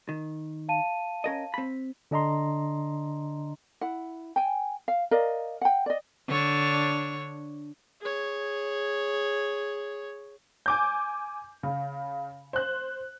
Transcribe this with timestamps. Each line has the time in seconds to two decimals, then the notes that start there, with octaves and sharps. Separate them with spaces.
0.09 D#3
0.68 F5 A5 D#7
1.24 C#4 A#4 D#5
1.54 C4 B5
2.11 D3 D4 D#5 A#5 C6
3.81 E4 F#5
4.36 G5 G#5
4.88 F5
5.11 A#4 D5 D#5 F5
5.61 F#5 G5
5.86 D5 D#5
6.27 D3 D4 C#5
8.01 G#4 C#5
10.66 G#5 D6 G6
11.63 C#3
12.53 C5 F#6